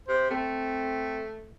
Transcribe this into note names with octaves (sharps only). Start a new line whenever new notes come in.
C3 C5
A3 C4